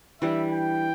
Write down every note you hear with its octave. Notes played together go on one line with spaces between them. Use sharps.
E3 G3 D4 E5
G5